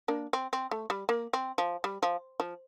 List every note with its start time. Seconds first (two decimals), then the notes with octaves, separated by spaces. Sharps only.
0.08 A#3 D4
0.33 C4
0.53 C4
0.71 A3
0.90 G3
1.09 A#3
1.33 C4
1.58 F3
1.84 G3
2.03 F3
2.40 F3